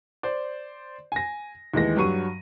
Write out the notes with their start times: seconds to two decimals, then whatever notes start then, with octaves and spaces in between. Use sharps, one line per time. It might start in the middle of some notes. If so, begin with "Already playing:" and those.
0.23 C5 D5
1.12 G#5 A#6
1.74 D#2 E3 G#3 A#6
1.97 G2 F#3 C#6 D#7